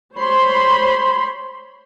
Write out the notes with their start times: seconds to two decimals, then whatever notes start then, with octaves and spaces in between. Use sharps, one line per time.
0.15 C5 C#5 B5 C6